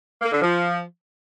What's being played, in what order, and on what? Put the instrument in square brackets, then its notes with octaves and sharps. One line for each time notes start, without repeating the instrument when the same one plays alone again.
[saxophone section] A#3
D3
F3